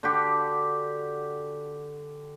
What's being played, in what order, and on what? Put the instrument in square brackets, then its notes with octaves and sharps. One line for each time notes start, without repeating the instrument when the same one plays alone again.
[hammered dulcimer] D3 F#4 G4